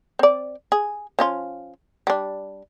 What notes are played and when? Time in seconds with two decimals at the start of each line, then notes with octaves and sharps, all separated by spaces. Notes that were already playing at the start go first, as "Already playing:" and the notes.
0.19 C4 D5
0.72 G#4
1.19 F3 C#4 F4
2.07 G3 D4